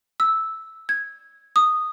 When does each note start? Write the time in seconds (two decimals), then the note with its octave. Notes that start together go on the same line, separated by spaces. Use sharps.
0.20 E6
0.89 G#6
1.56 D#6